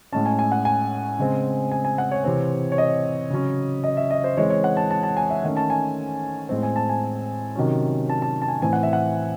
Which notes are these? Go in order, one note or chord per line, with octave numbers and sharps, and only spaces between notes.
A2 G#3 C#4 A5
G#5
G#5
F#5
G#5
C#3 G#3 C4
G#5
G#5
F#5
C#5
C3 E3 C4
C#5
D#5
C#3 F#3 C#4
D#5
E5
D#5
C5
E3 G#3 C4 C#5
C#5
F#5
A5
A5
A5
G#5
E5
D#3 A3 C#4
A5
G#5
A2 G#3 C4
G#5
A5
G#5
C3 D#3 F#3 C#4
A5
A5
A5
G#5
A2 E3 C4 G#5
F#5
E5
F#5